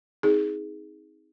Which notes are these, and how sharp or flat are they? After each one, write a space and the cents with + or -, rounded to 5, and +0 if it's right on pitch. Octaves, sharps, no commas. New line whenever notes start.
C4 +0 D#4 +30 G#4 +0